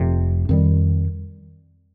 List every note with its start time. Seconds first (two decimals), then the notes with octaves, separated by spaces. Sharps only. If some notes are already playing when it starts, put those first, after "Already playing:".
Already playing: F1 F2 C3
0.49 F2 D#3 G3